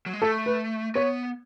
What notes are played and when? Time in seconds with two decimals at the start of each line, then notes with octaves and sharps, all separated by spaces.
0.06 F#3
0.13 G#3
0.22 A3 A4
0.46 B4
0.95 B3 C#5